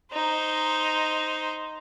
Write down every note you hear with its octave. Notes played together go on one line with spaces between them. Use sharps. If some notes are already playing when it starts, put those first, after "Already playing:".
D#4 C5